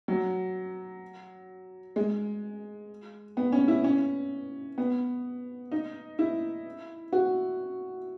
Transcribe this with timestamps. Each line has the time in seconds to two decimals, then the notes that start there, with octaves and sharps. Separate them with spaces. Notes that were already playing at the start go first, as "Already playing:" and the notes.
0.08 F#3
1.96 G#3
3.37 B3
3.52 C#4
3.68 E4
3.84 C#4
4.78 B3
5.72 D#4
6.19 E4
7.13 F#4